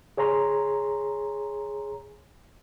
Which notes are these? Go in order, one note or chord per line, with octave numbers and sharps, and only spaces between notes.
G#4 C#5 G#5 A#5 C6